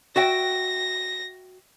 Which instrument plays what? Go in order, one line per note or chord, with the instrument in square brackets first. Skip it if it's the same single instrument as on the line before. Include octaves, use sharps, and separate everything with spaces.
[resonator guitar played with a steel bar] F#4 E5 G5 [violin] A#6